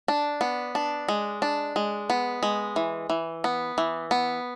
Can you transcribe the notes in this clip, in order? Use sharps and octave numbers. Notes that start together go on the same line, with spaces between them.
D4
B3
D4
G#3
D4
G#3
B3
G#3
E3
E3
B3
E3
B3